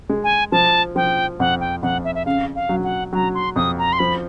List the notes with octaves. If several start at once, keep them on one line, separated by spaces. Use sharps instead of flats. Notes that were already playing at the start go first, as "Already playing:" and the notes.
G#3
G#5
F3 A5
F3 G5
F2 F#5
G5
F2 F#5
E5
E5
C#3 F5
F5
F#3
F#5
F#3 A#5
C6
F2 D#6
A#5
C6
F3 B5